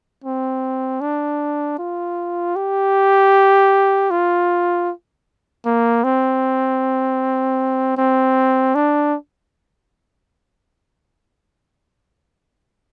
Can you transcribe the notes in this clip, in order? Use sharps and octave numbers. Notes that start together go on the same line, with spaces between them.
C4
D4
F4
G4
F4
A#3
C4
C4
D4